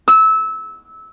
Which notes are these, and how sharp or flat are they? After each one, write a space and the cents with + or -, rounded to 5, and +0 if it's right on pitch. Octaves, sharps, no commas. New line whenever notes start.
E6 -20